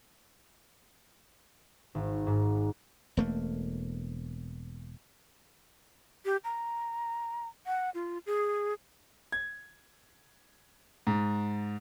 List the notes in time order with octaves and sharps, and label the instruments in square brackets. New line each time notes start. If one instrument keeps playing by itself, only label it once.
[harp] G#1
G#2
[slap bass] E1 A3 A#3
[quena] G4
A#5
F#5
F4
G#4
[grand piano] G#6
G#2